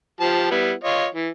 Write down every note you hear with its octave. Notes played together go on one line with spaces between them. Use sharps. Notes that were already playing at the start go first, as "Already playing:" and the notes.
F3 G4 A5
G3 B3 E4
F4 C#5 D#5
E3